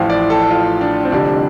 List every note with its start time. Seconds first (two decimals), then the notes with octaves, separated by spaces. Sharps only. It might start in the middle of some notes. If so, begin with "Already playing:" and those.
Already playing: A1 A2 F3 F5
0.10 D5
0.30 A4
0.51 F4
0.81 D4
1.05 C4
1.12 F1 F2 D3 G3 D4